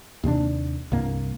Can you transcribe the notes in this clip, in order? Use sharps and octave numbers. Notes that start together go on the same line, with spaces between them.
D#2 C3 G#3 D4
C2 G2 A#3